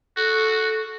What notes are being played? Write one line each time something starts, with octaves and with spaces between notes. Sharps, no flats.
F#4 A4